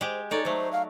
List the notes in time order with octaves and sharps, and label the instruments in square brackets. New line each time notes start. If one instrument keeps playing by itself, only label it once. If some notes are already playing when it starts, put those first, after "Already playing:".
[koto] G#3 G4 [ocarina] C5
[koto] D#4 C#5 D5 [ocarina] A4
[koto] F#3 A3 [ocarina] C5
[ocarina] F5